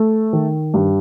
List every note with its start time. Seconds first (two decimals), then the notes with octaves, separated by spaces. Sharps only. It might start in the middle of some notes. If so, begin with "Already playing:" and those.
Already playing: A3
0.33 D#3
0.74 G2